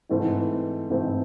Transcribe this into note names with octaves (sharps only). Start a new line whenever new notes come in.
G#2 E3 A3 C4 E4
G#2 E3 A3 C4 E4